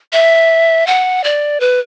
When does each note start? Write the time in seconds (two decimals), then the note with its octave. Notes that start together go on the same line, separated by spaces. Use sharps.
0.13 E5
0.87 F#5
1.24 D5
1.60 B4